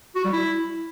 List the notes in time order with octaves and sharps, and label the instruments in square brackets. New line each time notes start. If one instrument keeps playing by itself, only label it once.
[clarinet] F#4
G3
E4